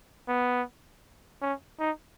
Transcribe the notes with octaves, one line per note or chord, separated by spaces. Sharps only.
B3
C#4
D#4